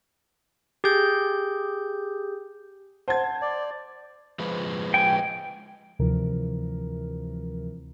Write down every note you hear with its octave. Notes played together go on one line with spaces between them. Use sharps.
G4 G#4 G6
C5 F#5 A5 G#6
D5
F3 G#3 B4
G5 G#5
D2 C3 E3 F3 A#4